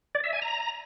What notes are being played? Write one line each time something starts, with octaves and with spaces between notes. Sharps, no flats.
D5
E5
G#5
A#5